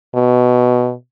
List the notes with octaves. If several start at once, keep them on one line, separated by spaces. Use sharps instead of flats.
B2